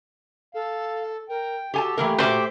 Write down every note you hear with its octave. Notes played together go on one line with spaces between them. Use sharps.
A4 F5
A#4 G5
F#4 G4 A4 G#5 A5
E3 A3 A#3 G4 A#4
A#2 F3 F#4 C5 E5 D6